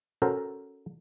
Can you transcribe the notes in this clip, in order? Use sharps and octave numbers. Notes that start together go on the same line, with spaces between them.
C#4 F#4 A4 A#4 C5